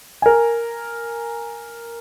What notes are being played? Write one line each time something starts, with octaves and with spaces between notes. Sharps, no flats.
A#4 G#5